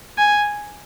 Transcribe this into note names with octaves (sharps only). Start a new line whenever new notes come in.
G#5